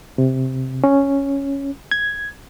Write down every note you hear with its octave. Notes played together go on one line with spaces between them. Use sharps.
C3
C#4
G#6